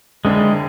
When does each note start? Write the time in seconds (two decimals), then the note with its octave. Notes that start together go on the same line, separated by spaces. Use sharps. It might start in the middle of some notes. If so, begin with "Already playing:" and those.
0.25 F#1 F2 D3 G#3